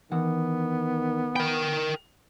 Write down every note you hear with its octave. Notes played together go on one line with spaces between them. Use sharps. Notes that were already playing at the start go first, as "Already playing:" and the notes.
D#3 E3 B3 F#5
A#4 G5 B5